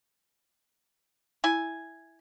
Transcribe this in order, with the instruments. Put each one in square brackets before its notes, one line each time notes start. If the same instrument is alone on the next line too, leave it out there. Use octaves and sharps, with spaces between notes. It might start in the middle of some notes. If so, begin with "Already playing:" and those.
[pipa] E4 G#5